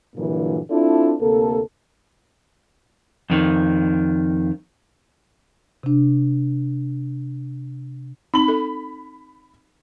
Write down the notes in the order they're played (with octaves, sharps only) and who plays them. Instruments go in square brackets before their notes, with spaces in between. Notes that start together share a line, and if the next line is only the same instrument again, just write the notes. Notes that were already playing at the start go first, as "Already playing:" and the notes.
[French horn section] G2 A#2 D3 E3 F#3 A#3
C4 D4 E4 F4 A4 D5
D2 C3 A#3 A4
[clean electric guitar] F2 D#3
[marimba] C3 D4
[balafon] C4 D#4 [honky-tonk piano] B5 F#7
[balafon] A4